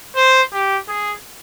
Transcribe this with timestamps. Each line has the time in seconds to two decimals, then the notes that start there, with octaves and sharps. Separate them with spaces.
0.16 C5
0.53 G4
0.88 G#4